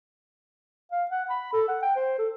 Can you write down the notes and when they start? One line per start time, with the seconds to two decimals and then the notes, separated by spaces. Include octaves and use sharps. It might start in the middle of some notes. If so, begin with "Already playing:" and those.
0.92 F5
1.11 F#5
1.30 B5
1.53 A4
1.68 F#5
1.82 G5
1.96 C5
2.19 A4